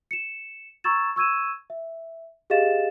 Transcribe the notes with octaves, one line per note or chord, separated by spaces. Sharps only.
C#7 E7
A#5 C#6 E6 G#6 A6 E7
C#6 E6 G#6 D#7 E7
E5
G4 G#4 D#5 F5 A6 E7